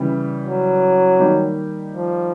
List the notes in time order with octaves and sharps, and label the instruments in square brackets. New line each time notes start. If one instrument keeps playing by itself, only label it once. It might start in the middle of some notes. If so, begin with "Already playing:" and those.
Already playing: [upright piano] C#3 E3 G3
[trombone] F#3
[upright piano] D#3 G3 A#3 D#4 G4
[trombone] F3